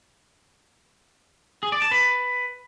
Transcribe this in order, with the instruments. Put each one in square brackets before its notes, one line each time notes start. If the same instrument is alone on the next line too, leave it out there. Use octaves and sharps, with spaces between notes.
[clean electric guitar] G#4
D5
A5
B4